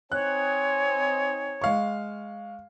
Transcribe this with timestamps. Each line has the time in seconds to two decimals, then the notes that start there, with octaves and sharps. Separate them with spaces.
0.12 C4 D#4 C#5 G#5 F#6
1.62 G#3 F5 C#6